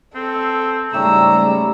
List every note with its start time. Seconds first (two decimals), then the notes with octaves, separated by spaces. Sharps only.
0.15 C4 A4
0.94 G#2 C#3 G3 A3 G4 C#5 A#5 E6